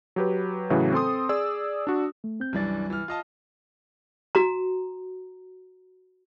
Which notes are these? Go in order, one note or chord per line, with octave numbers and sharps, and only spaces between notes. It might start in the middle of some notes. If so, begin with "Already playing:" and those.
F#3 G4 B4
A2 C#3 E3 F#3 F#4
C4 A4 C6 D#6
G#4 D5 E6
D4 F#4
A3
C4 G6
C2 F#2 E3 G3 D4 A6
E3 F6
F4 D#5 A5
F#4 A#5